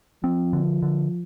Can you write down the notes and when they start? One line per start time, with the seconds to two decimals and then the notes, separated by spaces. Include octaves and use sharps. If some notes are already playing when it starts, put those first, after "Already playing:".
0.24 F3 C4
0.53 D3
0.82 D3